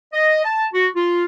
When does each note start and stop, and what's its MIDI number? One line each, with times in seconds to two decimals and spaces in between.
0.14 0.43 75
0.45 0.66 81
0.74 0.87 66
0.96 1.25 65